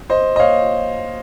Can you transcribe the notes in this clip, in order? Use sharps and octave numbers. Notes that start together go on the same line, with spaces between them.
C5 D#5
D#5
C#5 F5